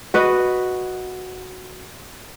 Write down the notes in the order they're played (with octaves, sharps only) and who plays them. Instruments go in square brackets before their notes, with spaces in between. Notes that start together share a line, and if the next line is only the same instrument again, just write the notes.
[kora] F#4 B4 D#5